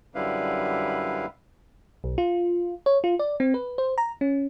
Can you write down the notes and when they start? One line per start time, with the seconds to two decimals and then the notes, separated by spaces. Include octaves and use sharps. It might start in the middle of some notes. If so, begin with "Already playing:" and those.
0.15 F#2 D3 G3 E4 B4 F5
2.04 B1
2.18 F4
2.86 C#5
3.04 F4
3.19 D5
3.40 C4
3.54 B4
3.78 C5
3.98 A#5
4.21 C#4